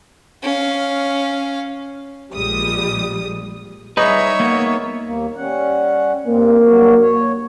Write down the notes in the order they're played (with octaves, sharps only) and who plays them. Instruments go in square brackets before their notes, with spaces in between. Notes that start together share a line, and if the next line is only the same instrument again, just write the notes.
[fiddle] C#4 F5
[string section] A#1 F3 G3 G#3 D#6
[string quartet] G3 D#5 E5 [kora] D#4 [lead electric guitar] G#4 B4 [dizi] C#5
[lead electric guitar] A#3 B3
[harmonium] D#2 A#3
G3 C#4 F#5
[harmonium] G2 C4 [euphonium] A#3
[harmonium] G2 F#3 F#4
C#5